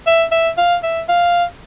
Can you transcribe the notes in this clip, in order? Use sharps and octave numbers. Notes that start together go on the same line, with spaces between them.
E5
E5
F5
E5
F5